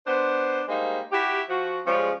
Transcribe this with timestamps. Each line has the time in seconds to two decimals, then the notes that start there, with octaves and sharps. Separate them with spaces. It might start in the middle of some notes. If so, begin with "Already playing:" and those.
0.06 B3 D4 C5
0.68 G3 G#3 A#3 D#4 C5
1.12 E4 F#4 G4
1.48 F3 F#4
1.86 C#3 F3 G3 G#3 C#4